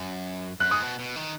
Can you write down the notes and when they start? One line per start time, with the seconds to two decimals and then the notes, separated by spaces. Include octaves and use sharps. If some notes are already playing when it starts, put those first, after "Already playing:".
Already playing: F#2
0.60 F#2 F#6
0.71 G#2 D#6
0.82 B2
0.99 B2
1.16 D#3